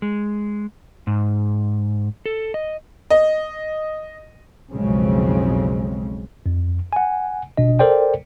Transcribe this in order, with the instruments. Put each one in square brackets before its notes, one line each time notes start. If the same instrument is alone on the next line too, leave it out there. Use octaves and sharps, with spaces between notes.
[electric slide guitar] G#3
G#2
A4
D#5
[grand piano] D#5
[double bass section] B1 F2 C#3 G#3 C4
[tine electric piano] F2
F#5 G#5
G1 B2 D4 D#5
A4 A#4 C5 D5 G5